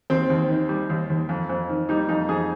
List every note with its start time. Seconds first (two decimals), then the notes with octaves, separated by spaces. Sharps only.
0.10 D#2 C4
0.30 D#2
0.49 D#3
0.69 G3
0.90 D#2
1.10 D#2
1.29 F2
1.49 F2
1.69 D#3
1.89 G3 D#4
2.09 F2 D#4
2.29 F2 G#4